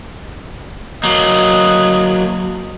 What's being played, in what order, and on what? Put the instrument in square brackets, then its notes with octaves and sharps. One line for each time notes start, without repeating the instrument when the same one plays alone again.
[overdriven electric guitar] F#3 A#3 [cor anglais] D#5